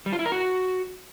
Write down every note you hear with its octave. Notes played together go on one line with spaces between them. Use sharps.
G3
F4
E4
A#4
F#4